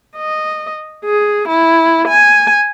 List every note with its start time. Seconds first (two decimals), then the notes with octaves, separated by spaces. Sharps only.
0.17 D#5
1.05 G#4
1.48 E4
2.08 G#5